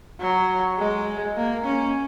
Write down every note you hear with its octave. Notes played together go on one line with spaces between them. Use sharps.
F#3
G#3
A#3
C#4